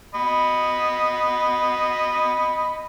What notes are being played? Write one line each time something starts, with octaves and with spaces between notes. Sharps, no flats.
D#5 B5